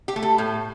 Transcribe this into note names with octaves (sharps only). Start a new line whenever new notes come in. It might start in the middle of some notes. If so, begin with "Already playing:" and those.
G4
A3
A4
A2